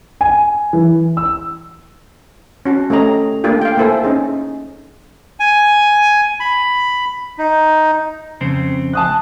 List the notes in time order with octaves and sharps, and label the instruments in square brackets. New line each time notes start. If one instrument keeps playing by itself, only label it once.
[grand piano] G#5
E3
E6
[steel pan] C#4 F#4 A5
A3 C#4 G4 C#5 D#5 A#5
A3 A#3 D4 F4 G4
F5 G5
A#3 E4 A4 C5 E5 G#5
C#4 D#4 G#4
[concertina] G#5
B5
D#4
[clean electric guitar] F2 C#3 C4
[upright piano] A5 D#6 F#6